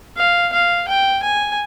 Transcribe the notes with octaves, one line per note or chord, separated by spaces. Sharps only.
F5
F5
G5
G#5